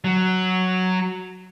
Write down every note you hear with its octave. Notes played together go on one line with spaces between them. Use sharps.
F#3